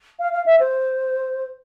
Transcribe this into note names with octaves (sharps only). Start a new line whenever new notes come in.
F5
F5
E5
C5